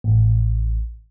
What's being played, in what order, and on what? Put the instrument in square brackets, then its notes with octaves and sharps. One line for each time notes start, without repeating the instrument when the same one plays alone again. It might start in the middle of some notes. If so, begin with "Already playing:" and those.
[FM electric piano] A1